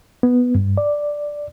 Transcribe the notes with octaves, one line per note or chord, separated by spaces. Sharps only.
B3
G2
D5